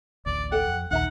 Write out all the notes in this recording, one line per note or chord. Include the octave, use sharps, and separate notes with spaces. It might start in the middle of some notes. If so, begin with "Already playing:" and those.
A1 D2 D5
A4 F#5 G5
F2
A#1 D#2 D#4 E5 F#5 A#5